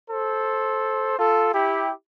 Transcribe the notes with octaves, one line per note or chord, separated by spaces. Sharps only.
A4 C5
F4 A4
E4 G4